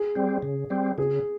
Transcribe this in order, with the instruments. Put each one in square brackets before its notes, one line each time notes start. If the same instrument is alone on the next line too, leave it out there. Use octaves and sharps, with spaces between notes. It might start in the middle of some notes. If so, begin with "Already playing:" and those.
Already playing: [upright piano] G#4
[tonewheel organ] G3 C4
C#3
G3 C4
[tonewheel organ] C#3 [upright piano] G#4